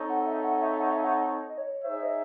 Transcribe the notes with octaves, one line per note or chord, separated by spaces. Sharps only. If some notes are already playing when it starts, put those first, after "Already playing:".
Already playing: C4 D#4 A4 C#5
F#5
E5
F#5
E5
F#5
E5
F#5
D#5
C#5
D#4 G#4 C5 C#5 E5
D#5